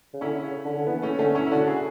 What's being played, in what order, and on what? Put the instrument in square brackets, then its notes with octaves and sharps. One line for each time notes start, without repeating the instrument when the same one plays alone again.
[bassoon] C#3
[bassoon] D3 [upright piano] C#4 E4
[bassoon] C#3
D3
D3
[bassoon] E3 [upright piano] B3
[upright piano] A3 C#4
[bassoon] D3 [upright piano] A3 C#4
[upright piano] C#4 E4
E4
[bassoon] D3 [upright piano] D4 F#4
[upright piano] E4 G#4